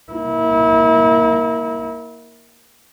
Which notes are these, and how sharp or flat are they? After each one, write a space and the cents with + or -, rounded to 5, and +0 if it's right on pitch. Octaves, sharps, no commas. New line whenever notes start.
A#3 +5 E4 -30